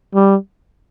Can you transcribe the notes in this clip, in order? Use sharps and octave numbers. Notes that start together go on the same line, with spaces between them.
G3